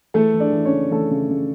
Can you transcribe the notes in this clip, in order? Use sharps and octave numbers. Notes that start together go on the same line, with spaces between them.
E3 A3 A4
E3
D4 D5
E3
C#4 C#5
C#3
E3 A3 A4
C#3
C#3